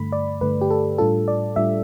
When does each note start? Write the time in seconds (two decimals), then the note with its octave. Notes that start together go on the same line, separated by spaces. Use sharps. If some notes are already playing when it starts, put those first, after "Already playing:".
Already playing: G2 D3 A3 B5
0.12 D5
0.41 G2 D3 A3 B4
0.61 G4
0.71 A4
0.98 A2 G3 D4 F4 A4
1.28 D5
1.56 A2 G3 D4 F4 E5